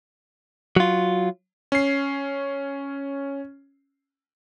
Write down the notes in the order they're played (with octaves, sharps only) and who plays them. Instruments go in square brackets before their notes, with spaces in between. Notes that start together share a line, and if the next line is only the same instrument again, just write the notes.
[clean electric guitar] F#3 F4
[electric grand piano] C#4 C7